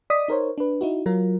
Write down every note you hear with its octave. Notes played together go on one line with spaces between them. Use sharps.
D5 D#5 D#6 B6
D#4 A#4 C5 C#5
D4 B4
D#4 E4 F#4
F#3 F4 A#4